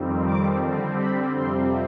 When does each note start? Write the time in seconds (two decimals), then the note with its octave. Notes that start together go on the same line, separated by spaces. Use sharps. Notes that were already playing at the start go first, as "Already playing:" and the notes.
Already playing: F2 D#3 G3 C4
0.26 D6
0.64 D3 G3 C4
0.99 B5
1.35 F2 C3 G3 C4 C6